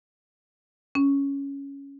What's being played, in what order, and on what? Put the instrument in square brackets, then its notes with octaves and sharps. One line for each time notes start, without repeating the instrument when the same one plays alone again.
[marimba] C#4